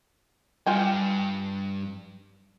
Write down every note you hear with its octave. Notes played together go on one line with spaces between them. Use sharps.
G2 F4 G5 G#5